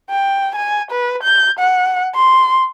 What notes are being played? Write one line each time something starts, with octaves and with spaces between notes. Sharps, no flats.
G5
G#5
B4
G6
F#5
C6